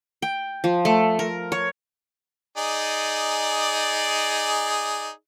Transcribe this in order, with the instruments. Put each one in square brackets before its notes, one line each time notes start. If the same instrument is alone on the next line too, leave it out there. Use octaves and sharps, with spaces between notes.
[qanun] G5
F3
A3
A#4
C#5
[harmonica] D#4 G#4 D5